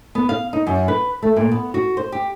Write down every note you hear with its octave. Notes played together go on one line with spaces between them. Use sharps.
B3
F5
D#4
F#2
B4
A3
A#2
B3
F#4
C5
G4